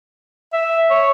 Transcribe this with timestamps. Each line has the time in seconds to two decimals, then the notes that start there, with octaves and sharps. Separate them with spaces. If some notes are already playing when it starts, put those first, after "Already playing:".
0.53 E5
0.91 C#5